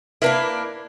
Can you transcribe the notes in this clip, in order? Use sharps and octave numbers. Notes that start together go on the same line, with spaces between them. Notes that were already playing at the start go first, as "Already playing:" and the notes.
A#3 D4 E4 A#4 B4